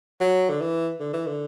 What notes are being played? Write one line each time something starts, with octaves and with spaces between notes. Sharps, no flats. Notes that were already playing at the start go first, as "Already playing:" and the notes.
F#3
D3
E3
D3
E3
D3